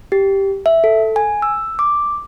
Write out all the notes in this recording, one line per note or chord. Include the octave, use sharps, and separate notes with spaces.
G4
E5
A4
G#5
E6
D6